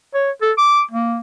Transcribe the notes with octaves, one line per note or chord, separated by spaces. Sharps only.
C#5
A4
D6
A#3